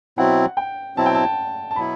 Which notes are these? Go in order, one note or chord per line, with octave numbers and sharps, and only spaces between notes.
B2 F#3 C4 E4 F#5
G5
B2 F#3 C4 E4 A5
G5
A5
A5
B2 F#3 B3 E4 B5